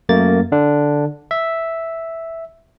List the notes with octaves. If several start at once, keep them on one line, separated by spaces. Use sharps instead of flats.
F#2 A3 A#3 A6
D3 D4
E5